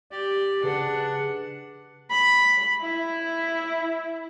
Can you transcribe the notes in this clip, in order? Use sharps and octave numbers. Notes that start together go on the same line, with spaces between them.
G4 D5
C#3 D4 G#4 B4 F#5
B5
E4